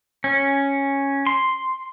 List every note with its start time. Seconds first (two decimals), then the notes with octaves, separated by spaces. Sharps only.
0.24 C#4
1.27 C6